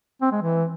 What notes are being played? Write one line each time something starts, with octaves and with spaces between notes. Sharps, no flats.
C4
G#3
E3